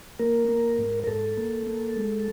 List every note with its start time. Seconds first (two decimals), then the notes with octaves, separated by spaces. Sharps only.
0.19 A#3 A#4
0.49 A#3
0.78 G#2
1.04 A#4
1.07 G#2 A4
1.37 A#3
1.67 A#3
1.96 G#3